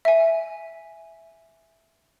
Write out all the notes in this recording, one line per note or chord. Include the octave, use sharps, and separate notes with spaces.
E5 G#5